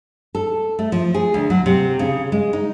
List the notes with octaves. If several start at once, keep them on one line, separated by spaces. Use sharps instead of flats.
A4
A3
F3
G#4
D2
F#3
C3
C#3
G#3
D#4